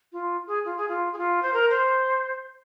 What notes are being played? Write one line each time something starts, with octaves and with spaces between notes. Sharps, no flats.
F4
G#4
F4
G#4
F4
G#4
F4
C5
A#4
C5